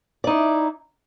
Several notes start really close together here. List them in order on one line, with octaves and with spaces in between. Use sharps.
D5 D#4 E4